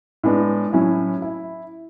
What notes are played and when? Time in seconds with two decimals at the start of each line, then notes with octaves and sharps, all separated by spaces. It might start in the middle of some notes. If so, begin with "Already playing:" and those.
0.24 A2 G#3 B3 D4
0.73 A2 F#3 C#4 E4
1.22 E4